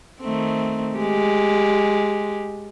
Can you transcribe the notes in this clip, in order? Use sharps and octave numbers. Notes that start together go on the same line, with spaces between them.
D#3 A3 C4
G#3 G4